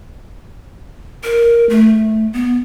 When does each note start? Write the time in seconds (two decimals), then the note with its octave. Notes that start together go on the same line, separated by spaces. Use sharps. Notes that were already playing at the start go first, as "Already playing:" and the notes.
1.24 A#4
1.69 A3
2.33 B3